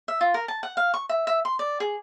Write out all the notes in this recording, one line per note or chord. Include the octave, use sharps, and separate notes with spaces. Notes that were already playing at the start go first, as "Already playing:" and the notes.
E5
F4
A#4
A5
F#5
F5
C#6
E5
E5
C6
D5
G#4